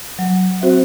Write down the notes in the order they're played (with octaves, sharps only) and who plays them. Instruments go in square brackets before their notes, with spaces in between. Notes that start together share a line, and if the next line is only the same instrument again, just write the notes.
[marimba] F#3
C4 F#4 C5 E5